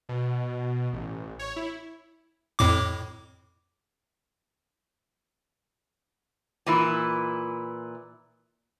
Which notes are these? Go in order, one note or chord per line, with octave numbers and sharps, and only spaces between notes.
B2
A1
C#5
E4
F2 A2 D6
A#2 E3 E4